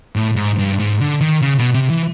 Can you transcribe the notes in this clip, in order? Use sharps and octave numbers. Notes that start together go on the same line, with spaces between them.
A2
G#2
G2
G#2
D3
D#3
C#3
B2
C3
E3